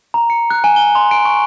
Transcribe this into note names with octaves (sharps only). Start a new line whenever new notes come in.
A#5
C#7
F#6
G#5
G7
C6
D7
C#6